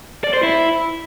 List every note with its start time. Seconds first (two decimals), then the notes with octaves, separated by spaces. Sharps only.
0.24 D5
0.34 C5
0.43 E4